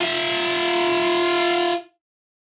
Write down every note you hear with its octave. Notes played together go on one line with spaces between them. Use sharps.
F4 E5